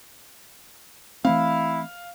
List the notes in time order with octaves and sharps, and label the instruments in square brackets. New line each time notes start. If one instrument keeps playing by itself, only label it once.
[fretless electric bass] E3 A3 C4 [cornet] E4 [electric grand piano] F5